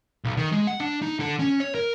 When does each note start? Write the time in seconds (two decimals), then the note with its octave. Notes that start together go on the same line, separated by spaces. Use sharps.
0.24 B1
0.37 D#3
0.52 G#3
0.67 F#5
0.80 D4
1.02 D#4
1.20 D3
1.39 C#4
1.60 C#5
1.75 A#4